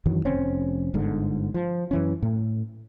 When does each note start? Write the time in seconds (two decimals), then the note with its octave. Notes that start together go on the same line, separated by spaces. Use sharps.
0.06 F#2 D#3 E3 F#3
0.25 F1 C4 C#4
0.94 G1 G#2 D3
1.54 F3
1.91 F#2 E3 C#4
2.22 A2